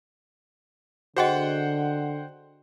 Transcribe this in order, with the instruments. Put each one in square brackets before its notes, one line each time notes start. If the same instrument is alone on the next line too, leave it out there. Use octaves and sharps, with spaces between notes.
[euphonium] D3 [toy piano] F#4 G#4 D#5 [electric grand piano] C5 F#5 G5